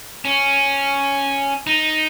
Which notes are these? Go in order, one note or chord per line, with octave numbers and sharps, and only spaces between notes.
C#4
D#4